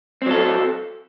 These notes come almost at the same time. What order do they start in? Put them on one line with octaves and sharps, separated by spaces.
C4 F#3 A4